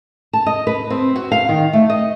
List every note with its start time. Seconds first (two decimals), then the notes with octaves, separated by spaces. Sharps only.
0.33 A5
0.46 D#5
0.67 B4
0.90 C4
1.16 F#4
1.32 F5
1.49 D#3
1.73 A3
1.90 D#5